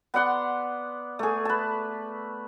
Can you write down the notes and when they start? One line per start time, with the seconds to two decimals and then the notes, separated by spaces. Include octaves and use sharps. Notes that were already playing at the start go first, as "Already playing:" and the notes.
0.14 B3 D5 F#5 C6
1.19 A3 G#4
1.45 B4 A5